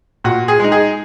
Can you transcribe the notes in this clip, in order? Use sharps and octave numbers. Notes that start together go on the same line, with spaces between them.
A#2 F#4
G#4
G#3 D#4
G#4